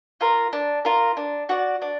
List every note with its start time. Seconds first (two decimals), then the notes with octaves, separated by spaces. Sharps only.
0.21 F4 A#4
0.53 D4
0.85 F4 A#4
1.17 D4
1.49 F#4 D5
1.82 D4